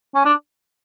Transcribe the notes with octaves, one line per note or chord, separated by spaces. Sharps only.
C#4
D4